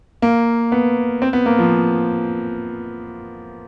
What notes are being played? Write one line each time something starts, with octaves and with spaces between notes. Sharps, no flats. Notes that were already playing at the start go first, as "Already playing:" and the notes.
A#3
B3
C4
B3
A#3
F3